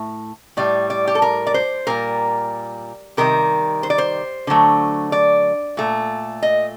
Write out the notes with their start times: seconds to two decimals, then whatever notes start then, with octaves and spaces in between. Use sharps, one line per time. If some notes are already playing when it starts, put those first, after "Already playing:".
Already playing: A2 A3
0.57 A2 G3 D5
0.90 D5
1.07 G4
1.15 A4
1.22 A#4
1.47 D5
1.54 C5
1.87 A#2 G3 A#4
3.17 C3 D#3 G3 A#4
3.83 C5
3.90 D5
3.98 C5
4.47 D3 F#3 A3
5.12 D5
5.77 A#2 A3
6.43 D#5